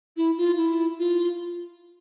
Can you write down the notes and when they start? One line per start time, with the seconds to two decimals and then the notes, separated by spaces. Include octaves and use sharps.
0.17 E4
0.38 F4
0.57 E4
0.99 F4